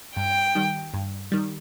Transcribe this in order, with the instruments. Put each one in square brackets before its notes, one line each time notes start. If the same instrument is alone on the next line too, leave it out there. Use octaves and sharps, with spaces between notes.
[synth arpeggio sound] G2 [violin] G5
[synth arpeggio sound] D#3 G3
G2
D#3 G3